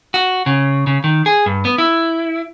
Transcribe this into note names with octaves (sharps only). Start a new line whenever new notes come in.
F#4
C#3
C#3
D#3
G#4
G2
B3
E4